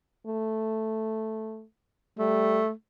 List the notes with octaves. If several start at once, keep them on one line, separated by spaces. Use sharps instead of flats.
A3
G3 A3